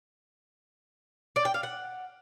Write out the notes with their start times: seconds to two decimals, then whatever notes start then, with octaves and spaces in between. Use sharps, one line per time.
1.36 D5
1.45 G5
1.54 F5
1.63 F#5